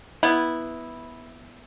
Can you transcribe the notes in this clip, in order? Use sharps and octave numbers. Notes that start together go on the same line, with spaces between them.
B3 E4